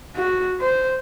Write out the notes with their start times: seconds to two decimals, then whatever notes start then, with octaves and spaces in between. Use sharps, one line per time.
0.16 F#4
0.61 C5